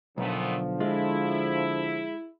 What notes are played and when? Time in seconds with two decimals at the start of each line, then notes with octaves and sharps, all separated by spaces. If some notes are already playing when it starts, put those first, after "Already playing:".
0.18 B1 A#2 D3 F3 A3 B3
0.80 G#3 E4 F4